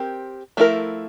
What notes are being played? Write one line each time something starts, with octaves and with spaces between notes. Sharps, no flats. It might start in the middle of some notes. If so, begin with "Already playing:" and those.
Already playing: C4 G4 A#4
F3 A3 E4 A#4